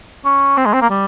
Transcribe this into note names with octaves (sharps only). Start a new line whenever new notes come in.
C#4
C4
G#3
C4
A#3
G3